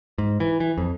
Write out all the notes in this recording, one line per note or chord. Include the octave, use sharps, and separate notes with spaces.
G#2
E3
E3
F2